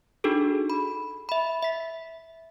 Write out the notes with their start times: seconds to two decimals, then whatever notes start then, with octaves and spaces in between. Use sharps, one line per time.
0.24 D4 D#4 F#4 G#4 A4
0.70 B5
1.29 E5 B5
1.63 E5 B6